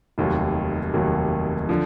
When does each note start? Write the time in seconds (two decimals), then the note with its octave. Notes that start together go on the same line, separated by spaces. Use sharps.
0.18 F1 D#2 D#3 F#3
0.94 F1 D#2 D#3 F#3
1.69 D3 F3